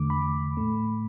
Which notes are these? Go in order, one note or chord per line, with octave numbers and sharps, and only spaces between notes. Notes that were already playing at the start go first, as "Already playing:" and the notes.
Already playing: E2 D3 A3 D6
B5
A2 A3